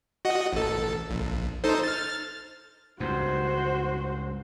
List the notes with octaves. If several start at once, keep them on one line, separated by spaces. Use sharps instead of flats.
F#4 D#5 F#5
A1 A4
A#1
D#4 A4 C5
F6 A6
C#2 G2 F#4 C5